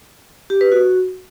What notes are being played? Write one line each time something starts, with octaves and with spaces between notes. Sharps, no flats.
G4
B4
F#4